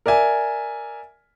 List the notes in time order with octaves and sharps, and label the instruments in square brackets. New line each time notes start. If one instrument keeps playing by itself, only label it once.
[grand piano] A#4 D5 E5 G#5